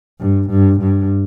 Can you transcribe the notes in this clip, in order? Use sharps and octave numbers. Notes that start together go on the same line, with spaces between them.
G2
G2
G2